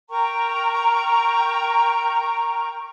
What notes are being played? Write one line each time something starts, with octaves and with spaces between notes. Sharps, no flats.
A#4 G5 A#5 C#6